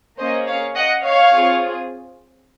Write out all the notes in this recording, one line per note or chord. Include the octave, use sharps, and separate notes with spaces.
A#3 C#4 G#4 C5 D#5
C#5 F5
D#5 F#5
C#5 F5
C4 F4 G#4